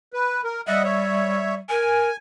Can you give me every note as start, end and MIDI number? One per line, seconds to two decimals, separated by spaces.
0.13 0.41 71
0.44 0.61 70
0.67 1.59 55
0.67 0.82 75
0.67 0.82 76
0.67 0.82 78
0.84 1.55 73
0.84 1.55 76
1.70 2.10 70
1.70 2.17 80